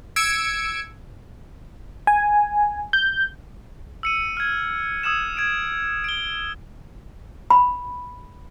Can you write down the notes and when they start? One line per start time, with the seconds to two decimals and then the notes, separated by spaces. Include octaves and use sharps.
0.16 E6 G#6 C#7 D7
2.07 G#5
2.93 G6
4.03 E6 C#7 D#7
4.37 F6 G#6
5.03 D#6 E6 G#6 E7
5.37 G#6 D7
6.04 D7 G7
7.50 B5